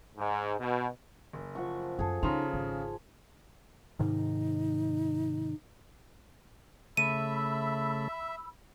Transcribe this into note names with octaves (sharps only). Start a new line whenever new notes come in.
G#2
B2
F#1
F3 F#5 C#6
F#2 G#4 A4
C#3 D#4 A#5 C6 F7
G#1
G#2 C3 D#3 D#4
C#3 A3 E5 B5 E6 D#7